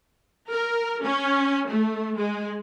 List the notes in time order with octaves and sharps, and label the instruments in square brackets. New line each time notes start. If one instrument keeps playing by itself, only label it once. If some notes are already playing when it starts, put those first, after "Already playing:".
[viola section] A#4
C#4
A3
G#3